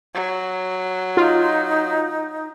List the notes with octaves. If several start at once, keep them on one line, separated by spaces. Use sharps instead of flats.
F#3
D#4 F4